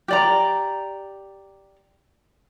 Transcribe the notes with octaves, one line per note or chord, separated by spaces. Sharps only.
G4 D5 A#5